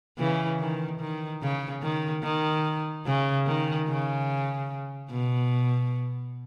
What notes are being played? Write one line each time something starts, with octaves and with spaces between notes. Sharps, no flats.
C#3 E3
D#3
D#3
C#3
D#3
D#3
C#3
D#3
C#3
B2